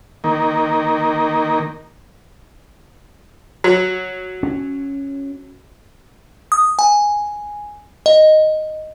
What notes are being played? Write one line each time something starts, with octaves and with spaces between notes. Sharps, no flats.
D#3 A#3
F#3
C#4
D#6
G#5
D#5